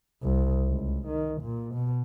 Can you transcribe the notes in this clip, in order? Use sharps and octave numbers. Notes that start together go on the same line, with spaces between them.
C2
C#2
D#3
A#2
B2